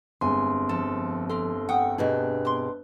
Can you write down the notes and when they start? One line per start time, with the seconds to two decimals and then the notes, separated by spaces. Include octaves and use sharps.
0.21 G1 F2 G#3 G#5 C6
0.69 F3 A4
1.29 A#3 A4 C6
1.69 F#5 G5 C#6 D#6
1.98 B2 D4 G4 G#4 B4
2.45 C6 D6